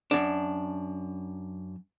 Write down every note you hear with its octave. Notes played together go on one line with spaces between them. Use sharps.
F#2 D4